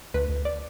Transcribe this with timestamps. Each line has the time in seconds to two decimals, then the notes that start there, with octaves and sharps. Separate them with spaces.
0.14 D2 B4
0.29 D2
0.45 D5